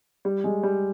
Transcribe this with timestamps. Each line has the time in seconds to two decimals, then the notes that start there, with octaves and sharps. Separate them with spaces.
0.25 G3
0.44 G#3
0.63 G3